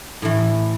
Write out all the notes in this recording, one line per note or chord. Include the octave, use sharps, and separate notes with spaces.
A2 E3